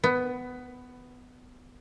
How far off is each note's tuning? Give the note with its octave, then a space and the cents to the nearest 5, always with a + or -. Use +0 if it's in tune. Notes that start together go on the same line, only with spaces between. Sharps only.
B3 +15